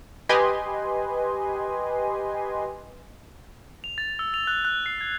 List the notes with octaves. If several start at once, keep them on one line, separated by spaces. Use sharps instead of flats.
G4 B4 D#5 G#5 C6
F7
A6
E6
F7
F#6
F#6
C7
G#6